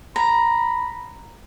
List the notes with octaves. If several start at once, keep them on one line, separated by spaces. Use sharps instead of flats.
A#5 B5